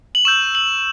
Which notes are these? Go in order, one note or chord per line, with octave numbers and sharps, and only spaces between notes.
F#7
C#6 E6 G6 E7
F#7